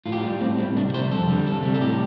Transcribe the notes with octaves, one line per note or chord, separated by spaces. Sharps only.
A2 F4
G4
G3 F4
A2 C4
G3 C4
C2 D4
C3 G3 C5
F2 A4
D3 G3
C2 A4
C3 G3
A4
A2 G4